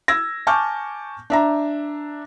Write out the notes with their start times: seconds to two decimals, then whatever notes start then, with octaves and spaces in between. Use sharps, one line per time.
0.08 E6 G#6 A#6
0.47 G#5 A5 C#6 D6 F6 G6
1.30 D4 E5 A#5